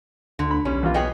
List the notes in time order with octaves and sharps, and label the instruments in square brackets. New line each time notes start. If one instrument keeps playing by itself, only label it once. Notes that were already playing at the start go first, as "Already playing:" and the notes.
[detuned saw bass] D2 [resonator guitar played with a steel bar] D3
[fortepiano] B5
[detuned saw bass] B1 [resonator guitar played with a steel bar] G3 [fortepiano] C#4
[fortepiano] E2 F4
[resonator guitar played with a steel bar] B3 G#4 C#5 [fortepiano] D#5 G5